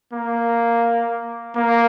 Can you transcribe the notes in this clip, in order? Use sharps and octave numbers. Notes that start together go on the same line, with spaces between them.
A#3
A#3